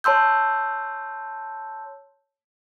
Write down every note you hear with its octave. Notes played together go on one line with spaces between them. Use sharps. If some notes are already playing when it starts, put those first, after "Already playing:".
C#5 A5 C6 E6 G6